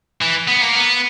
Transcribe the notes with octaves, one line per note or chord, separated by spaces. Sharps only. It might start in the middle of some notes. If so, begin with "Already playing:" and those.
E3
B3
A#3
B3